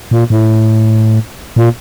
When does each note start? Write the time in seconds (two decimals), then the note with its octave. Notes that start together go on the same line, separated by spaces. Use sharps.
0.11 A#2
0.30 A2
1.56 A#2